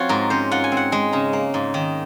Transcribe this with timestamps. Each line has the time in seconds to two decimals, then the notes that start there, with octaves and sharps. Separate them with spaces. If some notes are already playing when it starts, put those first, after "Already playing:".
Already playing: F3 C4 F4 F#4 C#5
0.09 G#2 A#4
0.30 C#4 C5
0.51 F4 F#5
0.64 G#5
0.72 C4
0.77 F#5
0.92 G#3
1.12 C#3 A#5
1.33 A#3
1.54 G#2
1.74 D#3